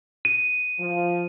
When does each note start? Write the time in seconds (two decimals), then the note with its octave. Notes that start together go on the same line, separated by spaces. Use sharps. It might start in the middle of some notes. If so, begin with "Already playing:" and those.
0.25 D#7
0.79 F3